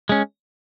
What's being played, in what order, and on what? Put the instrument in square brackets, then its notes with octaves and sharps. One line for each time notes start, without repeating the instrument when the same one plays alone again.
[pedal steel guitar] G#3 C#4